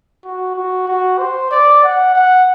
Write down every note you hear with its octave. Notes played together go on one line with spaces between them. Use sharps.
F#4
F#4
F#4
C5
D5
F#5
F#5